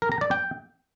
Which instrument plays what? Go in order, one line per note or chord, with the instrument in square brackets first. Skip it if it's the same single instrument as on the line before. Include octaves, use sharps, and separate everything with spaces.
[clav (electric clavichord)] A#4
A#5
D5
G5